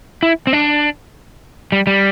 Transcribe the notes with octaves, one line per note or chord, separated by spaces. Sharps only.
E4
C4
D4
G3
G3